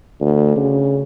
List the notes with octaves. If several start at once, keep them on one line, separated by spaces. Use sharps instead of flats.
D2
C#3